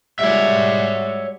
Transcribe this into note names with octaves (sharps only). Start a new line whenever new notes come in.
G3 G#3 F#4 C#5 E5